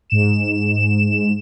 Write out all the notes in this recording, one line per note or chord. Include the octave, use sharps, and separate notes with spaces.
G#2 E7